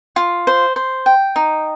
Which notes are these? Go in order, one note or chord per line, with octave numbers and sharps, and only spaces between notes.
F4
C5
C5
G5
D#4